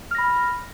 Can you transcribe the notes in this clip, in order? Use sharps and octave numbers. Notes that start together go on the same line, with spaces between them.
B5 F6 A#6